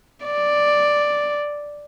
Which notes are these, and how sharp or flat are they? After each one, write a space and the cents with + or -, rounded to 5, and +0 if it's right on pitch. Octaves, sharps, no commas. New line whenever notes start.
D5 +0